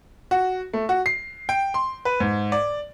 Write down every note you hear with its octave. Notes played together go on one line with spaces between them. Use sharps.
F#4
A3
F#4
C7
G5
C6
B4
G#2
D5